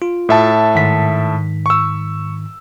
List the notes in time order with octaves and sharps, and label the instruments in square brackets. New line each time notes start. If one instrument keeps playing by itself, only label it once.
[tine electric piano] F4
[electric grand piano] A2 E5 A5
[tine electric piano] G#2 D#3 B6
[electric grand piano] C#6 E6